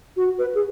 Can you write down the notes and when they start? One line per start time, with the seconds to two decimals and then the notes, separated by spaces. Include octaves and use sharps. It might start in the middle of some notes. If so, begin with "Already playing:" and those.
0.17 F#4
0.39 B4
0.55 G#4